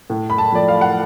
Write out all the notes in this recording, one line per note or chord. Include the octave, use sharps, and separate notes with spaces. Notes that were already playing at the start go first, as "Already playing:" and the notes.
A2
B5
A5
F3 A3 D5
F5
F#5